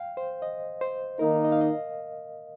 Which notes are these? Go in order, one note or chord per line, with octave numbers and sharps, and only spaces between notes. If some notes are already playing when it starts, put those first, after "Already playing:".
Already playing: F5 G5
C5
D#5
C5
D#3 A#3 D#4 A#4
D#5
F5
D#5